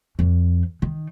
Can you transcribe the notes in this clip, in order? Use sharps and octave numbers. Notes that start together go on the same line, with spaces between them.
F2
D#3